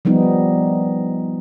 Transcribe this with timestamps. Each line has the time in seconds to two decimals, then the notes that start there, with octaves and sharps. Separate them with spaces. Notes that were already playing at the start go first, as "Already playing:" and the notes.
0.05 F3 G3 B3 D#4